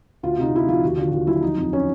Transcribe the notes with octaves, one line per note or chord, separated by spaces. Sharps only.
D2 F4
C3 D#4
D2 E4
F3 F4
D#2 F#4
D3 F4
D#2 F4
F#3 E4
F3 D#4
F2
C#4